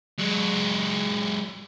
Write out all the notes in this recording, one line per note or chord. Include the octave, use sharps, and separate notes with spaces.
F#3 G#3